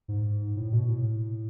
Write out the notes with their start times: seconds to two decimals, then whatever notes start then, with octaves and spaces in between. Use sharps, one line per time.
0.08 G#2
0.56 A2
0.72 B2
0.88 A2